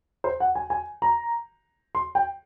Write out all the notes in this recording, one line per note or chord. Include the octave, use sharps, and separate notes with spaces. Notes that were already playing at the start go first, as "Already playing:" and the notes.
C5
F#5
G#5
G#5
A#5
C6
G5